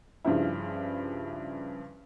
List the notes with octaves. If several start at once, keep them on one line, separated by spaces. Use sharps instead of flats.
G2 C#3 F3 E4